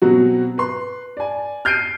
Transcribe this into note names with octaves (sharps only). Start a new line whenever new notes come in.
B2 F#3 C4 F#4
B4 C6
D5 G#5
F6 G6 C7 D7 D#7